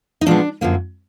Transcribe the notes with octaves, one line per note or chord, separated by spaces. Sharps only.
D#4
A#2 F3 G#3 B3 D4
F#2 D3 F3 A#3